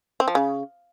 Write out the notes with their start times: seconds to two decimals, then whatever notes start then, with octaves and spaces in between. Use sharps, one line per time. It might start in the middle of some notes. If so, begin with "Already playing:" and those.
0.20 C4
0.28 F3
0.35 C#3